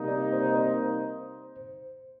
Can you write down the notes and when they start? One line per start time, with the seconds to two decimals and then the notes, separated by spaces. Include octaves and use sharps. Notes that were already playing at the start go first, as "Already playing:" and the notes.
Already playing: C3 G3 A#3 D#4
0.08 D5
0.33 C5
0.56 C5